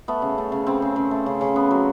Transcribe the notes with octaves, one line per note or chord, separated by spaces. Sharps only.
A3 B3
C#3
A3
C#3
C#3 C4
C#3
C#3
A3
C#3
C#3
B3
F#3